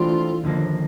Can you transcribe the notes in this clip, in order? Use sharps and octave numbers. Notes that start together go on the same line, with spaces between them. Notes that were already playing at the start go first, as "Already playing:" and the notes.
Already playing: E3 A3 D4 F4 G4 C5
D#2 D3 F3 A#3